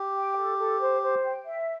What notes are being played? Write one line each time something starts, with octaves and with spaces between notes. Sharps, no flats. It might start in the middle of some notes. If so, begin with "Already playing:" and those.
Already playing: G4
G5
A4
A4
C5
C5
G5
E5